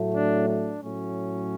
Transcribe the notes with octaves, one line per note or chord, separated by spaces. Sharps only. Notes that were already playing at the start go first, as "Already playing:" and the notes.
Already playing: A2 F#3 A3
D4
D4
A2 F#3 A3 C#4